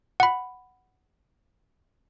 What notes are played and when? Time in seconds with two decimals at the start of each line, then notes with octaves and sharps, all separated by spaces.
0.20 F#5 B5